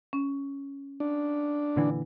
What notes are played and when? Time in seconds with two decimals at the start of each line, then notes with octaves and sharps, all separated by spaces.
0.13 C#4
1.00 D4
1.76 A#2 D3 E3